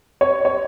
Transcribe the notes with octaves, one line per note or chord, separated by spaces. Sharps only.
C#5
C#5